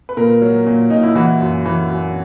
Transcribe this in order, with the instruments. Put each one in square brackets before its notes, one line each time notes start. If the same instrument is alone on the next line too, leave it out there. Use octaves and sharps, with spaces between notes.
[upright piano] B4
A#2 A#4
F#3
A#2
A#2 D#4
E4
E3 F#4
F#2
E3
F#2